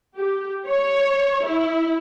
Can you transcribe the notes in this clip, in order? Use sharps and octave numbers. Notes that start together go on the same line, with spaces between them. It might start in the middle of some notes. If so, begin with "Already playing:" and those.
G4
C#5
E4